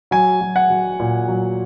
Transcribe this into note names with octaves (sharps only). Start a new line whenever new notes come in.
F#3 G#5
F#3
F#5
F#3
A#2
F#3